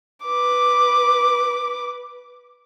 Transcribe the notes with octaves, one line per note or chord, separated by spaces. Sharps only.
B4 D6